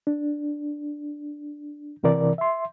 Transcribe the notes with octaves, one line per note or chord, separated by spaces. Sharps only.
D4
C2 C3 E3 A#4 D5
E5 C6